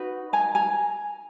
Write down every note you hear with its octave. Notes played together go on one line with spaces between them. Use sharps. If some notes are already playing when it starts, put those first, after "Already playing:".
Already playing: D#4 F#4 B4
G#5 A#5
G#5 A#5